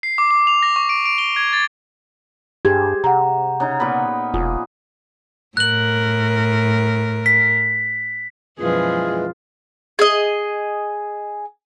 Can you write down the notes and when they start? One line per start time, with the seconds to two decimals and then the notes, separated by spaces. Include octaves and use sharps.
0.03 C7
0.18 D6
0.31 D6
0.47 F7
0.62 A#6
0.76 C#6
0.89 D7
1.05 D7
1.18 G7
1.36 G#6
1.53 A6
2.65 G2 G4 G#4 C5 G#6
3.04 C3 F#5 A#5
3.60 C#3 D#4
3.80 A#2 B3 B5
4.34 E1 F4 G#4
5.57 A2 A#4 F#6 F#7
7.26 B6
8.59 F#2 B2 E3 F3 G#3 F4 G#4 B4
9.99 G#4 D#5